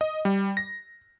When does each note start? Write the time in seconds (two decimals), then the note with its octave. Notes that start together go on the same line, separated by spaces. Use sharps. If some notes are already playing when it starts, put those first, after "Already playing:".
0.01 D#5
0.25 G3
0.57 A#6